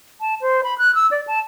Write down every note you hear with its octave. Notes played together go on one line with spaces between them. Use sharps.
A5
C5
B5
F#6
E6
D5
A5